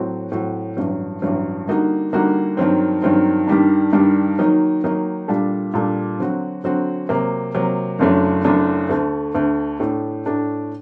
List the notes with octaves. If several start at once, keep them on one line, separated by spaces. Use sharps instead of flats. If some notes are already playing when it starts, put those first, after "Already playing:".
Already playing: A2 F#3 C4 F#4
A2 F#3 C4 F#4
A1 G2 F#3
A1 G2 F#3
D3 G3 A#3 D#4 F#4
D3 G3 A#3 D#4 F#4
G2 D#3 F#3 C4
G2 D#3 F#3 C4
G2 D#3 G3 D4
G2 D#3 G3 D4
D#3 F#3 A#3 D#4
D#3 F#3 A#3 D#4
A#2 G3 D4 A4
A#2 G3 D4 A4
D3 F#3 C4 F#4
D3 F#3 C4 F#4
C3 F#3 A#3
C3 F#3 A#3
F#1 F#2 F#3 A3 D4
F#1 F#2 F#3 A3 D4
D2 D3 A3
D2 D3 A3
A2 A3 D4
A2 A3 D4